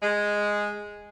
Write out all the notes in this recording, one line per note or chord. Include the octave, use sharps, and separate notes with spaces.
G#3